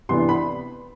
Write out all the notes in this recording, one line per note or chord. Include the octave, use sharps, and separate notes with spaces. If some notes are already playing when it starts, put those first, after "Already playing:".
C3 E3 B3 D4 C6
B5